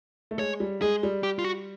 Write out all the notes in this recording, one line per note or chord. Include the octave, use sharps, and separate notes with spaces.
A3
G#3 C#5
G3
G#3 G#4
G3
G4
F4
F#4